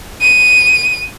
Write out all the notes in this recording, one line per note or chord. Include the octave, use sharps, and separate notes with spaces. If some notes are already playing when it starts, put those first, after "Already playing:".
D#7